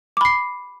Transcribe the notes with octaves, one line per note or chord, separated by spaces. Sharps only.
B5 D6 C7